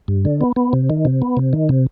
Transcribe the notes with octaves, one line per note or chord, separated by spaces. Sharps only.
G2
D3
B3
B3
C3
D#3
C3
B3
C3
D#3
C3